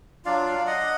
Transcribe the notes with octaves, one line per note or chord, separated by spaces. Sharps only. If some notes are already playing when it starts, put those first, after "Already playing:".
F#3 D4 F4 D5 F5
D#5 F#5